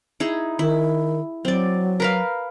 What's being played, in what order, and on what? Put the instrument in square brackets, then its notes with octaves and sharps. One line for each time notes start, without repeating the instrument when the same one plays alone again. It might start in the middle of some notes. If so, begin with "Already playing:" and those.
[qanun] D#4 E4 G#4
[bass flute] D#3 [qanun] E4
[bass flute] F#3 [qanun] C4 D5
[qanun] A#4 B4 F5